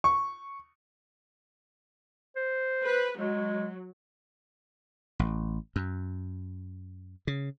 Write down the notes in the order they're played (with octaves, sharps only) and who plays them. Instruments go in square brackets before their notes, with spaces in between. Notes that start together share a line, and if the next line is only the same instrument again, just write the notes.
[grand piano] C#6
[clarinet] C5
[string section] B4
[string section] F#3 [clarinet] G#3
[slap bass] A1
F#2
C#3